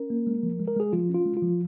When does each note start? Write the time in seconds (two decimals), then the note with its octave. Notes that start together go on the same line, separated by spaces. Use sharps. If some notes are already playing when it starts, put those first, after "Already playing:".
Already playing: C#4 A#4
0.10 A#3
0.27 G#3
0.43 F3
0.60 G#3
0.68 A#4
0.76 G#3 G#4
0.93 F3 F4
1.09 C#4 F4
1.26 G#3
1.37 F4
1.42 F3